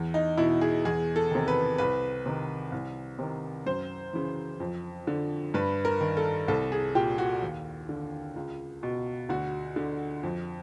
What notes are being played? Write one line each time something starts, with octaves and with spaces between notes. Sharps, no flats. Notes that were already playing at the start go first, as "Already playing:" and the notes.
Already playing: E2
D#4
B2 E4
G#4
E2 G#4
A4
C3 D#3
B4
C2 B4
C3 D#3
C2
C3 D#3
F#2 C5
C#3 E3
F2
D3
G2 B4
A#4
D#3
A4
C2 A4
G#4
A#2 G4
F#4
D#2
D3
C#2
B2
D2 F#4
D3
F2